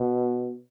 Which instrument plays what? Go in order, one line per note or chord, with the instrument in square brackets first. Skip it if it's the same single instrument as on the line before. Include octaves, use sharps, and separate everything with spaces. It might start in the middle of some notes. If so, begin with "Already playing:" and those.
Already playing: [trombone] B2